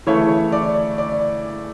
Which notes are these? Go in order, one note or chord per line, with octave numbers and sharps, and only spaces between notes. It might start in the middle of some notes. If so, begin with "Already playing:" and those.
C#3 E3 A3 C#5
D5
D5